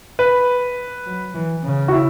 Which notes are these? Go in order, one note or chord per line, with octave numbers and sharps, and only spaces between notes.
B4
F#3
E3
C#3
F#4
E4